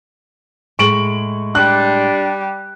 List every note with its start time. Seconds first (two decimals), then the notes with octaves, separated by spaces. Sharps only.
0.79 A2 G#3 C#6 D7 F#7
1.55 G3 D4 F#6